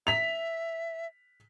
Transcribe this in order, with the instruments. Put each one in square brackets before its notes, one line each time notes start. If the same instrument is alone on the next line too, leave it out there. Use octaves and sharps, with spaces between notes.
[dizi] E5 [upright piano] B6 F7